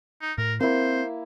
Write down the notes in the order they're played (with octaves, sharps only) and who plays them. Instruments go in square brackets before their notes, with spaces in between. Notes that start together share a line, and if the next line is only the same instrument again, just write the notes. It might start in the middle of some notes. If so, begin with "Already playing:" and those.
[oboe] D#4
[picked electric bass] A2 [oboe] A#4
[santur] A#3 E4 [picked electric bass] C4 [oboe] C5